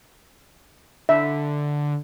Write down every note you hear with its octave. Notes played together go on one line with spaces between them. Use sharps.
D3 E5